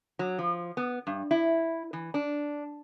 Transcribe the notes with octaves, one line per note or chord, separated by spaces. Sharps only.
F#3
F3
B3
G2
E4
E3
D4